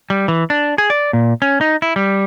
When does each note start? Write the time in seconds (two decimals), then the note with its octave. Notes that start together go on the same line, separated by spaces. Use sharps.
0.10 G3
0.28 E3
0.50 D4
0.78 G#4
0.90 D5
1.13 A#2
1.42 C#4
1.61 D#4
1.82 E4
1.96 G3